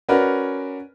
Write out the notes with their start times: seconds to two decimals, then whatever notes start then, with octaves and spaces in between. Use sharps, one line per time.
0.09 C#4 F#4 A#4 B4 D5